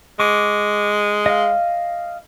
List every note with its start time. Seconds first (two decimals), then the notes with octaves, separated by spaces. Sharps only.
0.20 G#3 C#6 D6
1.26 D#5 F5